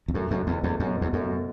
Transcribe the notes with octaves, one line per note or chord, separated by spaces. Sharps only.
E2
F#2 A3
F#1 F#2
E2 B2
E2 A3
F#2 B2
E2 B2
F#2 A3
B2